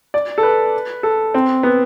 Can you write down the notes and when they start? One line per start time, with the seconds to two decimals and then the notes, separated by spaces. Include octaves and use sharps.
0.14 D5
0.38 A4
0.43 B4
1.03 A4
1.34 C4
1.63 B3